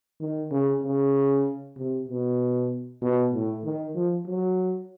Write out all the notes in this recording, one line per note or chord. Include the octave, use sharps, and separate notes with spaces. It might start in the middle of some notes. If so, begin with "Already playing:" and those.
D#3
C#3
C#3
C3
B2
B2
A2
D#3
F3
F#3